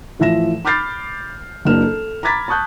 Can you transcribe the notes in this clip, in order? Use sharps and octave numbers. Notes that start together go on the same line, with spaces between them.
A2 E3 F3 E5 A#6 E7
B5 D6 F6 G6 A6 C7
F#1 F#3 A#3 D4 F6 E7
A4
A#5 B5 D6 G#6 A6 B6
A5 C#6 D#6 F#6 G6